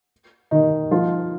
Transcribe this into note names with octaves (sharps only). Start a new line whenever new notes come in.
D#3 D#4
F3 F4